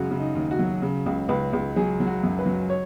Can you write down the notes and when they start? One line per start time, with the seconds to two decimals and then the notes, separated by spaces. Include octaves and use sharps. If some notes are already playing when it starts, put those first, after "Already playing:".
Already playing: F#2 C#3 G#3 F#4
0.11 C#3
0.20 D#4
0.35 D#2
0.51 F#4
0.59 F#3
0.82 C#3
1.06 C#2
1.29 C#2 B4
1.53 C#2
1.76 F#3 G#4
2.00 F#3
2.07 F#4
2.23 F#2
2.39 B4
2.46 F#3
2.70 C#5